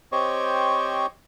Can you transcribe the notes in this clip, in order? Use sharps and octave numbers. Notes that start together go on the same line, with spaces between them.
C4 G4 C5 C#5 D#5 C#6